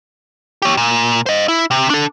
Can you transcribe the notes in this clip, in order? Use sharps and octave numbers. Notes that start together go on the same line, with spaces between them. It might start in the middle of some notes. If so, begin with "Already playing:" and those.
G4 C#5
A#2
C5 D#5
E4
C3
D4 A4